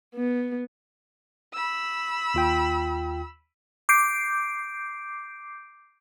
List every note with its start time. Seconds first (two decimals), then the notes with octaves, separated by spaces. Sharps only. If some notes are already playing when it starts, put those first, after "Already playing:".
0.15 B3
1.54 B5 E6
2.34 D#2 F4 G5
3.89 D6 G6 C7 D7